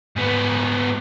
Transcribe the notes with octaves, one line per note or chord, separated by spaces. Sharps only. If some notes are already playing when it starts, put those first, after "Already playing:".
G#2 B3